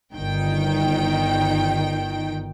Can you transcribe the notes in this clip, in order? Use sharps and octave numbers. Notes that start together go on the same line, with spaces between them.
G1 D#3 G5